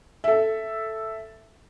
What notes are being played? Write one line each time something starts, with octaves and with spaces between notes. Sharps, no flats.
A4 E5